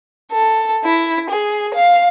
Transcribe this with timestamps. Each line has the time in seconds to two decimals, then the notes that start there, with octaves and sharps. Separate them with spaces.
0.32 A4
0.84 E4
1.30 G#4
1.74 F5